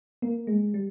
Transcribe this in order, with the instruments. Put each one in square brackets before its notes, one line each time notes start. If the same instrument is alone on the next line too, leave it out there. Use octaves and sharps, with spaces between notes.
[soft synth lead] A#3
G#3
G3